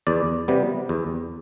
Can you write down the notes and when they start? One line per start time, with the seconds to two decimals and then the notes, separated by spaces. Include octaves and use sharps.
0.07 E2 D5
0.48 C3 G3 B3
0.89 E2